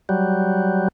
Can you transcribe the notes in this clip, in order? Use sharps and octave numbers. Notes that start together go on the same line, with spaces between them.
F#3 G3